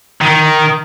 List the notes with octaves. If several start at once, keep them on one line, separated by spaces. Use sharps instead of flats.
D#3